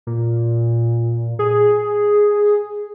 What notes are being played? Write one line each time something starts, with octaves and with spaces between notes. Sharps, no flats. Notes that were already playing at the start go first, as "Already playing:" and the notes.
A#2
G#4